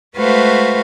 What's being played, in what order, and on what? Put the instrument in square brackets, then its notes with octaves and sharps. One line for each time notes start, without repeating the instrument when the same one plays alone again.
[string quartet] G#3 A3 F#4 B4 C5 F5